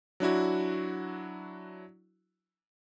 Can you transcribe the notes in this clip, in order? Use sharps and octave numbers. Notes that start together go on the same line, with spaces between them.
F#3 D4 E4 F#4